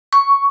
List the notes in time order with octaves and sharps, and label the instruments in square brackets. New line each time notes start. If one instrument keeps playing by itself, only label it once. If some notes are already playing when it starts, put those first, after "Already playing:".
[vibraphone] C#6